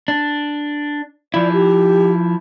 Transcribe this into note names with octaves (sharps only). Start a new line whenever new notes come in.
D4
F3 E4 D5
G4